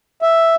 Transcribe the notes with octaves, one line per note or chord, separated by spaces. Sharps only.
E5